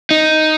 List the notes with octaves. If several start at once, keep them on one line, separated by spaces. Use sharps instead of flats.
D#4